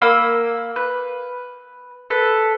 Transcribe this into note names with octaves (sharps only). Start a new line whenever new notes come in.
A#3 B5 E6
B4
A4 B4